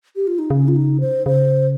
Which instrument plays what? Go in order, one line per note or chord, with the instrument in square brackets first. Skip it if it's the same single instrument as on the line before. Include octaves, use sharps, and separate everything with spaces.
[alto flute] G4
F4
D#4
[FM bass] C#3 [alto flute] C#4
[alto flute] F4
D#4
C5
[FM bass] C#3 [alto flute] C5